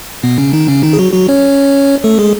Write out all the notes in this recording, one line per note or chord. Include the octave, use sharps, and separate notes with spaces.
B2 B3
C#3 C#4
D#3 D#4
C#3 C#4
D#3 D#4
G#4
F#3 F#4
F#3 F#4
C#4 C#5
A3 A4
G#3 G#4